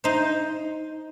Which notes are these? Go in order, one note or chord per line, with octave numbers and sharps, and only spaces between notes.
D#4 C5